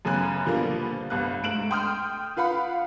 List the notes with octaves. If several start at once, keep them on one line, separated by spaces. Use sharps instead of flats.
F#2 C#3 B3 G#5 F#6
A#2 D3 F3 G3 A#3 B3
G1 C2 B3 F#6
G#2 A3 D7 E7 F#7
G5 C6 D#6 F6 G6
F4 B4 F5 F#5 B5